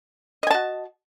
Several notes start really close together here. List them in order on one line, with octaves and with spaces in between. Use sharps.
D#5 G#5 A5 F#4